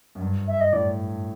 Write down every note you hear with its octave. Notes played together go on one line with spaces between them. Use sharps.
F#2
G2
E5
D#5
A2 D5